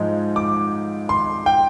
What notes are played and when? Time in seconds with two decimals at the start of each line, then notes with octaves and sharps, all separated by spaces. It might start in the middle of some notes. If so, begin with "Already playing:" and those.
Already playing: G#2 F3 G#3 D#4
0.36 D6
1.09 C6
1.46 G5